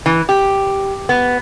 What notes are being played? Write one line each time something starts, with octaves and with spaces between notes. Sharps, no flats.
E3
G4
B3